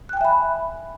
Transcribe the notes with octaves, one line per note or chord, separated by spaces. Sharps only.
E5 G5 G#5 B5 F#6